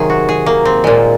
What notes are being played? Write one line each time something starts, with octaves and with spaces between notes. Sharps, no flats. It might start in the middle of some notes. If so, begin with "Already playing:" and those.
Already playing: C3 D#3 F#3 G#4
F#4
G#4
A#3
C4
A#2 G#3